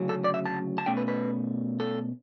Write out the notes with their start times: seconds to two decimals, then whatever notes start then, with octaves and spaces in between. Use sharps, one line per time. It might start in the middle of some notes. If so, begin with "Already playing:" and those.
Already playing: D2 C#3 F#3 C#4
0.09 A4
0.24 D5
0.34 E5
0.46 A5
0.78 A5
0.86 B2 A3 C#4 G5
0.97 B4
1.08 B4
1.80 A4